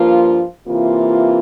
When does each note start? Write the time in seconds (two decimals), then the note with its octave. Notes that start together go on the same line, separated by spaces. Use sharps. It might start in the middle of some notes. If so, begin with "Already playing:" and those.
Already playing: G2 F3 A#3 F4
0.68 C3 E3 A#3 F4